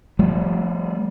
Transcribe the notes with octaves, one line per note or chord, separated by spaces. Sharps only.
F3 G3 A3